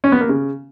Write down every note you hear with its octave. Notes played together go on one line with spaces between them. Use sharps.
C#4
B3
A#3
C#3